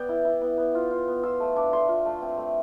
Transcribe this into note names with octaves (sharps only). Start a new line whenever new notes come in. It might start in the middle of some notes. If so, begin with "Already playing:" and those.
Already playing: B3 D5 G5
E4
E4
B3
B3
F4
F4
B3
F4 E6
A3
D4 D6
A3 C6
F4
A3
C4
A3